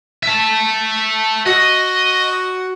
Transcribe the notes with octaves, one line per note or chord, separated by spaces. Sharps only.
E5 A5
F#4 D#5